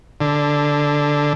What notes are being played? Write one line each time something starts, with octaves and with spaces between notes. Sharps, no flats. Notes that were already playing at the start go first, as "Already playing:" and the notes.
D3